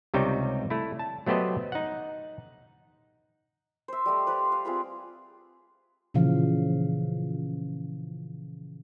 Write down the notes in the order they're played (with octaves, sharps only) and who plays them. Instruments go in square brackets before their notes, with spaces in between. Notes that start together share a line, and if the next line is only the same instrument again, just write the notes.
[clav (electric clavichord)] C#2 C3 G3 D#4 C#5 G5
A3 E4
A5
F#3 A3 B3 G4 C5 D#5
D#4 F#5
[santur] C5 E5
G3 A3 G4 D#5
B4 C5 D5 F5
F5
C4 F4 G#4 B4
[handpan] A#2 C#3 E3 F3 F5